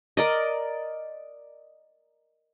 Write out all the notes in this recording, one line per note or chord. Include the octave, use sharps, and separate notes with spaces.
A#4 D5 D#5